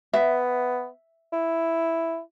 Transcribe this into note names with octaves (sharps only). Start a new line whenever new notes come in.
B3 E5
E4